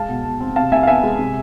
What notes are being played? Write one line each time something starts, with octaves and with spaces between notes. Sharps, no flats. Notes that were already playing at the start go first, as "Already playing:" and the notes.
Already playing: G#3 F5 A5
B2
B2
C4
C3 F5 A5
C2 E5 G#5
F5
B3 E5 G#5
G#3
C3